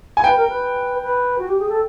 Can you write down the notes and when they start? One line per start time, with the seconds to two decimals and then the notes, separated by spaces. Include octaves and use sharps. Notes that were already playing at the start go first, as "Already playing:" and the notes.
0.17 G#5
0.23 B4 G5
0.36 A#4
0.49 B4
1.02 B4
1.39 F#4
1.48 G4
1.59 G#4
1.69 A4